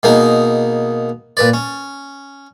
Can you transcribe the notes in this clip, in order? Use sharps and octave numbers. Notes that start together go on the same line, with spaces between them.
B2 A#3 D#4 G#4
A#2 B4 D5
C#4